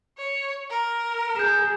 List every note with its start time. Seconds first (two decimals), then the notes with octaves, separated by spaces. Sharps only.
0.18 C#5
0.70 A#4
1.36 G#4 G6 E7